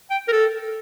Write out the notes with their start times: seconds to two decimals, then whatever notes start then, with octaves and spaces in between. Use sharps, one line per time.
0.11 G5
0.28 A#4
0.32 A4